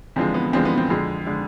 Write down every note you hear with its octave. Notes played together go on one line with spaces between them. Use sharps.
E2 D3 F3 G#3 C4
B3
E2 D3 F3 G#3 C4
B3
C4
F2 D3 G#3
D3 G#3